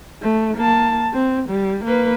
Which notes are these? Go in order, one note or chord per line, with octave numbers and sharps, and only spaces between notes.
A3
A#3 A5
C4
G3
A#3 B4